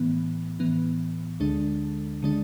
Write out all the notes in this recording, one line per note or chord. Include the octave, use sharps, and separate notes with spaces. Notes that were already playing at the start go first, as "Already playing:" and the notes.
Already playing: A2 E3 B3
A2 E3 B3
D2 D3 G#3 D4
D3 G#3 D4